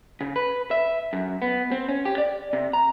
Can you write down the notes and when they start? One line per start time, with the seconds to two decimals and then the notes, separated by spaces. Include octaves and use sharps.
0.21 C#3
0.36 B4
0.71 E5
1.13 F#2
1.42 B3
1.72 C4
1.88 C#4
2.05 G4
2.18 D5
2.53 C3
2.73 A#5